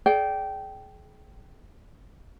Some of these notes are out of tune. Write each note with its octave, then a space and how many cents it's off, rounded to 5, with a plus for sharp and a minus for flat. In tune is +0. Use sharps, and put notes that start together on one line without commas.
G#4 +35 D5 +0 G5 -15